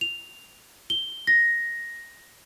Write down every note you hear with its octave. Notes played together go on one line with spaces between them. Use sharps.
F7
G7
A#6